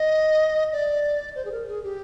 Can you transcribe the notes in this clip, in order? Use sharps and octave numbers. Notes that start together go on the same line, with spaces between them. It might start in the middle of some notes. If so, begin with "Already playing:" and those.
Already playing: D#5
D5
C5
G#4
A#4
G#4
G4